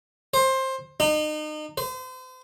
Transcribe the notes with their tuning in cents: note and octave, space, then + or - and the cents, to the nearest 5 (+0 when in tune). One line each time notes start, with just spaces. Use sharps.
C5 +15
D#4 -35
C5 -40